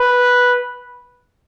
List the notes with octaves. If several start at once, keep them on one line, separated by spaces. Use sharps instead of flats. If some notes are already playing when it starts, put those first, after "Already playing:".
Already playing: B4